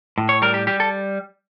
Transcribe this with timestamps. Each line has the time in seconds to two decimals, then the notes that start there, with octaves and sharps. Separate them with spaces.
0.18 A2
0.29 C#5
0.42 G3 A#4
0.54 G4
0.67 G3 G4
0.80 A4